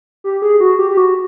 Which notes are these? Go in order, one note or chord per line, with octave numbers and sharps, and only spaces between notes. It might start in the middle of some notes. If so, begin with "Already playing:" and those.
G4
G#4
F#4
G4
G4
F#4